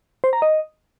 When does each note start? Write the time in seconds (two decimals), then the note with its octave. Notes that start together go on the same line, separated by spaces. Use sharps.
0.24 C5
0.33 A#5
0.42 D#5